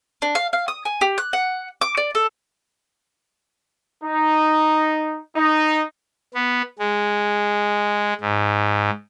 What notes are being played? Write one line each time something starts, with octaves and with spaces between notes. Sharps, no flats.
D4
F5
F5
D#6
G#5
G4
F#6
F#5
D6
D5
A4
D#4
D#4
B3
G#3
G#2